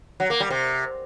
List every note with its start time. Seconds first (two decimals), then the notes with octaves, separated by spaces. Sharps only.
0.20 F#3
0.30 A#3
0.40 G3
0.50 C3